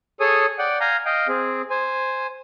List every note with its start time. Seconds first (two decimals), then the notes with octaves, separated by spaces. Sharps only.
0.20 G#4 A4 C#5 G#5 D#6
0.59 D5 F#5 G5
0.80 F5 G#5 A#5 G6
1.05 D#5 F5 G5
1.28 C4 G#4
1.70 C5 G#5